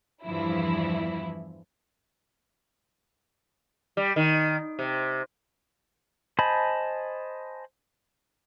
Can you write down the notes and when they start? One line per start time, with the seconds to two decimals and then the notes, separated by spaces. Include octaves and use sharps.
0.24 E2 G2 E3 F3 E4
3.97 G3
4.16 D#3
4.79 C3
6.39 C5 D#5 G#5 A5 B5